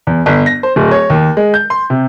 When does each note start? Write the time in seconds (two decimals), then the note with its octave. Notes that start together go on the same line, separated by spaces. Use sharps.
0.07 E2
0.26 G1
0.46 A#6
0.63 C5
0.76 D1
0.91 C#5
1.10 D#2
1.37 G#3
1.54 G6
1.70 C6
1.90 C3